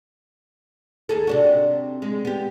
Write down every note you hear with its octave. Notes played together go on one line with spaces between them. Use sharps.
D#2 G#4 A4
C3 D4 F#4
G#3
B3 G4